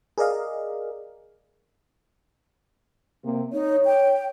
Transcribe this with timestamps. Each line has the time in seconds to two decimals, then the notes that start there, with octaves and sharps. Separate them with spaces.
0.18 G#4 A#4 D5 D#5 F5
3.24 C3 A#3
3.53 D#4 C#5
3.85 G5